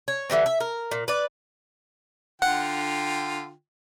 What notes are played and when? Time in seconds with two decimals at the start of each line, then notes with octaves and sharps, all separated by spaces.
0.08 C#5
0.30 D3 E3 G3 C4
0.46 E5
0.60 A#4
0.91 A#2
1.08 B4 D5
2.42 D3 F4 F#5 G5